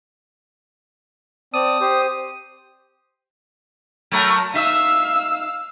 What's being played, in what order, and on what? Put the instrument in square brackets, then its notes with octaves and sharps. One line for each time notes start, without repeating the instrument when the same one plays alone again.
[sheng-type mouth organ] C4 D5 A5 [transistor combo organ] D#6
[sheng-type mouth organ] G4 C5
[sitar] F#3 A3 A#4
[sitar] D#4 E5 [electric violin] F5 E6